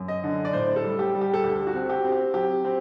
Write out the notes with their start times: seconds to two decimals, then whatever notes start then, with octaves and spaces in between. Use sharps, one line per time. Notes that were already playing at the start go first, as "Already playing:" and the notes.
Already playing: F#2
0.08 D#5
0.24 D3
0.45 D5
0.53 A2 C5
0.76 A4
0.84 G3
0.99 G4
1.14 G3
1.21 G4
1.33 A4
1.44 D2 G4
1.67 F#4
1.74 C4
1.89 G4
2.05 C4
2.12 G4
2.34 F#3 G4
2.65 C4